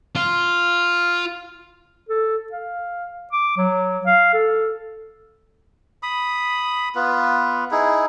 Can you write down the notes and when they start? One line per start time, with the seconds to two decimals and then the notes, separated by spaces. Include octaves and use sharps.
0.15 F4
2.09 A4
2.53 F5
3.33 D6
3.57 F#3
4.06 F5
4.34 A4
6.03 B5 D#6
6.95 B3 F4 B4
7.71 D#4 E4 G#4